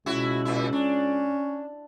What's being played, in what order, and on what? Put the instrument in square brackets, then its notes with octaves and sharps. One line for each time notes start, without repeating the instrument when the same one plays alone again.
[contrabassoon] C#2 [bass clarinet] B2 [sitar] E4 F#4
[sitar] A#2 E4
[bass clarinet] C#4 [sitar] D4